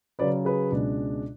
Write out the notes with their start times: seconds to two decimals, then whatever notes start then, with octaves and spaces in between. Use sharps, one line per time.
0.19 C#3 F#3 C#4 B4 D5
0.45 G#4 B4
0.72 C#2 B2 G#3 D4